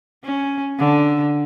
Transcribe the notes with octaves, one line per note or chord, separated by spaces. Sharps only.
C#4
D3